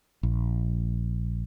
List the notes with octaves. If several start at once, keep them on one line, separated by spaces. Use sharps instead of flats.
A#1